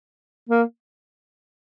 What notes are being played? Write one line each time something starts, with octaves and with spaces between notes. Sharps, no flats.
A#3